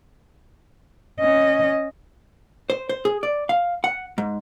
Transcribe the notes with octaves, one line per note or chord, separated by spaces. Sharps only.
C#4 D#5
C5
C5
G#4
D5
F5
F#5
G#2